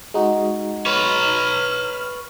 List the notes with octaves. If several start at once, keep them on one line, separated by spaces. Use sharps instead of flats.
G#3 D#4 F#4
B4 C#5 F6